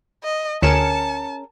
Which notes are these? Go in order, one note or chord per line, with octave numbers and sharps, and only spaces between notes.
D#5
D2 C#4 G#4 A#4 A5 C#7 E7